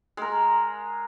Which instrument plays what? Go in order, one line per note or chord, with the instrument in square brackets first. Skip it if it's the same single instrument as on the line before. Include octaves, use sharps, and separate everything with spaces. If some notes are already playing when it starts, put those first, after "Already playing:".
[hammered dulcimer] G#3 A#4